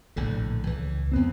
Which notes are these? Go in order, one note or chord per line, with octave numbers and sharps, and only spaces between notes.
A#1 A2 D3
C#2 E3
F2 B3 C4